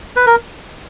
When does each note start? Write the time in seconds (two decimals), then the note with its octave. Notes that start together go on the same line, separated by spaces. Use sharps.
0.16 B4
0.26 A#4